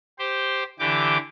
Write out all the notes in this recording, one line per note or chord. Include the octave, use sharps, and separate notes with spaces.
G4 C5
D3 E3 G4 D6